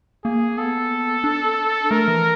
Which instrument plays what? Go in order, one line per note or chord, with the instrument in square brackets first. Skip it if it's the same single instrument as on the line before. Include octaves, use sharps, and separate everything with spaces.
[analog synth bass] A#3 [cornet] G#4
[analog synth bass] B3 [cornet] A4
[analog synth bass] D4
[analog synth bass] A3 [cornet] A#4
[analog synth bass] E3